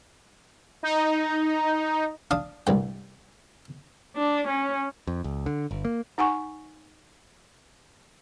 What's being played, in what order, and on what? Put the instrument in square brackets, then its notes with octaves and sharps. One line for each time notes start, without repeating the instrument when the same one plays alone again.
[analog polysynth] D#4
[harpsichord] D4 F5 D#6
C2 G2 G5
[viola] D4
C#4
[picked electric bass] F2
C#2
D3
G1
A#3
[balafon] D#4 F#5 G#5 C#6